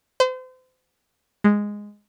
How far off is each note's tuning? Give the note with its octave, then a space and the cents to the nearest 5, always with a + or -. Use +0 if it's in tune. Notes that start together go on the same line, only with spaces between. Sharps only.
C5 -35
G#3 -5